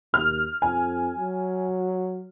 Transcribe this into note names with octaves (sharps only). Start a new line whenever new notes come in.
D#2 F6
F2 G#5
F#3